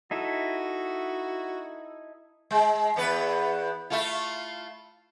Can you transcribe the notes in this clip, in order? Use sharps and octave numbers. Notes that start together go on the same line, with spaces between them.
D#4 E4 F#4 A4
G#3
E2 B3 B4
A3 E4 F4